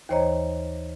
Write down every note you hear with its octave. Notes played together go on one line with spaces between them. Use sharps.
D#2 E3 C5 C#5 D#5 A#5